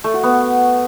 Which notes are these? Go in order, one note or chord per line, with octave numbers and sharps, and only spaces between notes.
A3
F#4
B3